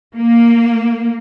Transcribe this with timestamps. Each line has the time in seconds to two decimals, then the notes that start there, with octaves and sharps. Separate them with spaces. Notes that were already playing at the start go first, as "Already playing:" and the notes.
0.17 A#3